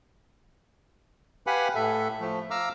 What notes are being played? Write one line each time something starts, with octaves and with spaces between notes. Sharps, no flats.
G4 B4 F5 F#5 G#5 B5
A2 A4 E5
F3 A3
F5 A#5 D6 E6 F6